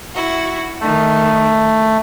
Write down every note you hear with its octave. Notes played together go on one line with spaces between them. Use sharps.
E4 F#4
D#3 A3